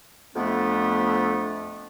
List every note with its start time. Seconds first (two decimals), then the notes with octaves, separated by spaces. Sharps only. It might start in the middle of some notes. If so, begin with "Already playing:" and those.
0.36 F2 A3 B3 D4